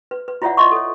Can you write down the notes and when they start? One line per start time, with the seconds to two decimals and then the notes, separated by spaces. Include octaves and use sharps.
0.11 B4
0.28 B4
0.42 E4 F4 C#5 D5 E5 F#5
0.57 D#5 E5 C6 C#6
0.72 A4 C#5